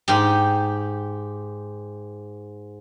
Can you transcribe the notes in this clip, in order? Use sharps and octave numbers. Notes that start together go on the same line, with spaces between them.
G#2 G4